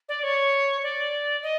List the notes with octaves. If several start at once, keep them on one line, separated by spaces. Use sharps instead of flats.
D5
C#5
D5
D#5